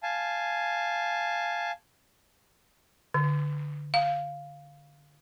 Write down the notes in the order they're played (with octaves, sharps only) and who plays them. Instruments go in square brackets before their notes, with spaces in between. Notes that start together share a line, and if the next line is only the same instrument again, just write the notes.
[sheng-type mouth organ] F5 G#5 A5
[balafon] D3
F5